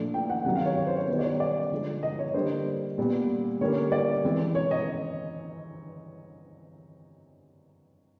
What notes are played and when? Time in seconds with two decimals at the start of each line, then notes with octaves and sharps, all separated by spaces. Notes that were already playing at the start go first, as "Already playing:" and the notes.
Already playing: A#2 F3 A3 D4
0.14 G5
0.30 F#5
0.45 C3 D#3 F#3 F#5
0.56 F5
0.66 C#5
0.77 C#5
0.87 C5
0.98 C#5
1.08 D#3 G3 B3 C5
1.19 D5
1.24 C#5
1.40 D5
1.72 D3 F3 G#3
2.03 D#5
2.19 C#5
2.34 D3 G3 A#3 D4 C5
2.98 A#2 G3 B3
3.61 D3 G3 A#3 C#4 C#5
3.92 D5
4.24 E3 G#3 C4
4.55 C#5
4.71 D#5